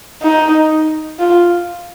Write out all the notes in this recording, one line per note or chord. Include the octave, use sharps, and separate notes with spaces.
D#4
F4